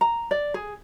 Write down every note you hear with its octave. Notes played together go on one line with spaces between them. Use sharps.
A#5
D5
G#4